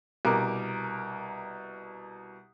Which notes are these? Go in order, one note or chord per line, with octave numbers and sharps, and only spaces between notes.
C2 B2 A#4 D6